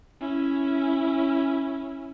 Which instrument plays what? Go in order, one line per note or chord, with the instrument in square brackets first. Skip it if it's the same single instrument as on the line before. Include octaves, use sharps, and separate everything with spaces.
[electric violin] C#4 E4